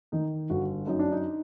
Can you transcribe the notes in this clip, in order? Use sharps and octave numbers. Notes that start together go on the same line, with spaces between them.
D#3 D#4
G1 F#4
F#2 D#4
D4
D#4